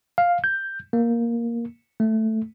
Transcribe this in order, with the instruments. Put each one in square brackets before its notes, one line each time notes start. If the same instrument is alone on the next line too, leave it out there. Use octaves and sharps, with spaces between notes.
[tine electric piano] F5
G6
A#3
A3